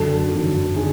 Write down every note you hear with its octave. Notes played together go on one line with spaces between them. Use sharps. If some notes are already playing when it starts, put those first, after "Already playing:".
Already playing: F#2 D3 F#3 A4
F#2 D3 F#3
D3 F#3 G#4